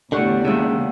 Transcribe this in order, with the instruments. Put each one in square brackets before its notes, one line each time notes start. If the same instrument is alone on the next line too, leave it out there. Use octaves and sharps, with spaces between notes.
[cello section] E2 D4 [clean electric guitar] A2 D3 [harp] G4 F#5 C#6
[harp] D#2 G#3 E5 [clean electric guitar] C#3